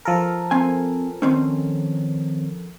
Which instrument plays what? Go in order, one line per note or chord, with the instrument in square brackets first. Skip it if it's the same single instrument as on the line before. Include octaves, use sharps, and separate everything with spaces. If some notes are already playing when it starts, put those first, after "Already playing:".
[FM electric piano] F3 A4 A#4
[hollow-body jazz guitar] C4 G#5
D#3 C4 C#4